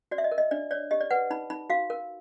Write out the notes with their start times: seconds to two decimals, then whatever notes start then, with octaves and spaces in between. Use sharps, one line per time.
0.11 F#4 D5
0.18 E5
0.24 D#5
0.32 A#4
0.38 D#5
0.51 D4 D5
0.71 C#5 D5
0.91 G4 D#5
1.01 D5
1.11 B4 F#5
1.31 D#4 B5
1.50 D#4 B5
1.70 F#4 F5
1.90 A#4